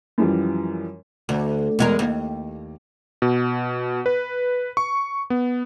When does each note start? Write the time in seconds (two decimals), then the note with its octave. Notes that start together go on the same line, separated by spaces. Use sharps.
0.18 F#2 E3 F3 G3
1.29 D2
1.79 E2 G#3 A#4
1.99 D#2
3.22 B2
4.06 B4
4.77 C#6
5.30 B3